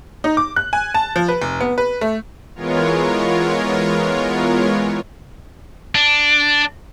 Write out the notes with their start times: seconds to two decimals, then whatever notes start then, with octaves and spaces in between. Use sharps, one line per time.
0.24 D#4
0.37 D6
0.56 F#6
0.73 G#5
0.95 A5
1.16 F3
1.28 B4
1.42 F1
1.61 B3
1.78 B4
2.01 A3
2.56 E3 G#3 B3 F4 A#4 C#5
5.95 D4